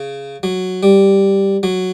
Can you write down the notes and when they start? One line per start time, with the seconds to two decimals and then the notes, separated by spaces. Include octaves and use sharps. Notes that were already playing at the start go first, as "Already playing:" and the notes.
Already playing: C#3
0.43 F#3
0.83 G3
1.63 F#3